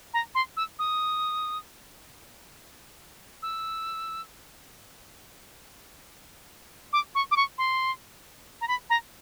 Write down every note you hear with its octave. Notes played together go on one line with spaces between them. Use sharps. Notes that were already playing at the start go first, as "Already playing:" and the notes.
A#5
C6
E6
D#6
E6
D6
C#6
D6
C#6
C6
A#5
B5
A#5